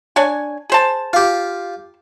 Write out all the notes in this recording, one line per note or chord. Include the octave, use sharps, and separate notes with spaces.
D4 C#5 G#5
G#4 C5 A5
F4 G4